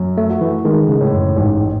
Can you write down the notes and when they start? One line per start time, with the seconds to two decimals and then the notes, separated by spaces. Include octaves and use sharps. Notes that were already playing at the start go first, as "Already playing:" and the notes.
Already playing: F#2
0.17 A3
0.30 F#4
0.41 E3
0.65 D#3 G#3
0.88 C#3
1.00 A2
1.13 F#2
1.37 A1 G#2